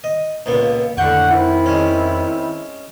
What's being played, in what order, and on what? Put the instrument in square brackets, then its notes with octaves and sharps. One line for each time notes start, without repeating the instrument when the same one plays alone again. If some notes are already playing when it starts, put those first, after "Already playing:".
[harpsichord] D#5
C#2 A#2 B3
[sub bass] F2 [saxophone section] A2 D3 F#5 [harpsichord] G5 C#6
[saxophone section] D#3 C4 E4
[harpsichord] G#3 C#4